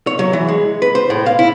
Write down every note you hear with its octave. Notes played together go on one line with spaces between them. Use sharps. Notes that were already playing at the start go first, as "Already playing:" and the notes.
C#5
F#3
E3
G#3
B4
C5
A2
F5
E4